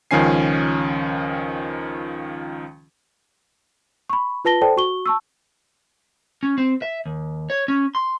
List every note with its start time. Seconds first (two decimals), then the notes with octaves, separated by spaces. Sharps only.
0.11 C#2 D#3 F3 C#4 G#5 C7
4.10 B5 C#6
4.45 F4 B4 A5 A#6 G7
4.61 A4 C5 D5 G5 A5
4.77 F#4 C#6 G7
5.06 A5 C#6 E6
6.43 C#4
6.58 C4
6.82 E5
7.06 D#2
7.50 C#5
7.68 C#4
7.95 C6